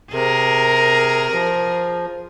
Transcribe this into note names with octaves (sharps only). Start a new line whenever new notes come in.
C3 G#4 A#4
F3